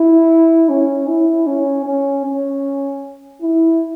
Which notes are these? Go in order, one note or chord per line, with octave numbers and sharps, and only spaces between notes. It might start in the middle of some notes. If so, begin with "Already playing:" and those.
Already playing: E4
C#4
E4
C#4
C#4
C#4
E4